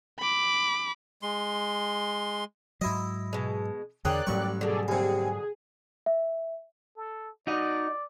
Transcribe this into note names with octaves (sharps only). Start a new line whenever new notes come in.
B5 D6
G#3 C6
G#2 F#3 E4 D#5
B2 G#3
E2 D3 A#3 G#4 C#5 D5 G5 F#6
A1 G#2 F#3 G3 C#6
B2 D3 G#4 A4 D5
D#2 C3 G#4
E5
A4
D#4 F#4 D5 D#5